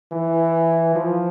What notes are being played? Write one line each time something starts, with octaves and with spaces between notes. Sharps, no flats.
E3
F3